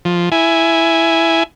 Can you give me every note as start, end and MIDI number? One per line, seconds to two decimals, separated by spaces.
0.05 0.29 53
0.32 1.43 64
0.32 1.43 80